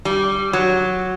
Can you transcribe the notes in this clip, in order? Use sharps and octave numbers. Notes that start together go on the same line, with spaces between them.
G3
F#3